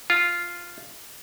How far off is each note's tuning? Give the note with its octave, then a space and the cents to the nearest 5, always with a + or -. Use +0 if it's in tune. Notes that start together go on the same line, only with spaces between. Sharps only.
F4 -5